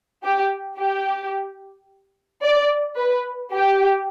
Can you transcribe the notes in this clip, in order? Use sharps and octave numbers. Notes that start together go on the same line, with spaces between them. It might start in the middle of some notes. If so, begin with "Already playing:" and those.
G4
G4
D5
B4
G4